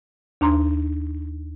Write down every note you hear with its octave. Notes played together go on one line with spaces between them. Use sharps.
D#2 D4 A#5 C6